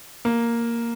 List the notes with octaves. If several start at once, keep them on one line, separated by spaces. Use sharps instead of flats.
A#3